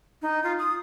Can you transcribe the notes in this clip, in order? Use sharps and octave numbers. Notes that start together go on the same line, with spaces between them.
D#4
F4
D#6